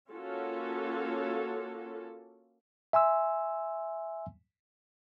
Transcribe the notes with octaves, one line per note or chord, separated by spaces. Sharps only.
A#3 C#4 F4 F#4 A4
E5 G#5 C6 E6